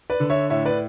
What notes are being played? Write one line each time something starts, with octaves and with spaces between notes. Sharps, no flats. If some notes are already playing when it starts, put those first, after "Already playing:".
B4 D5
D3
C#5 E5
A2 C#5 E5
B4 D5